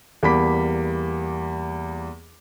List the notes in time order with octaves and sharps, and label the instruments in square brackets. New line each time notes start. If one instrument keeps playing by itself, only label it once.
[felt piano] E2 G3 A#3 B5 D6 B6